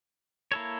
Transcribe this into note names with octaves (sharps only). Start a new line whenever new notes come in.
A#3 E4 A4 C#5